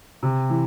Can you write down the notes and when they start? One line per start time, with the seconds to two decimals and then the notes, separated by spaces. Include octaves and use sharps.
0.23 C3
0.50 E3